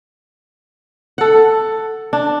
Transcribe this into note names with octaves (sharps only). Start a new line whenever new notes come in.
A4 F#5
D4